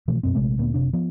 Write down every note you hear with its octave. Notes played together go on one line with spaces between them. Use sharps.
B2 E3 F3 A3
F#2 B2 C4
A#1 C3 G#3 A3
D2 A#2 A#3 B3
F#1 C3 D4
F3 B3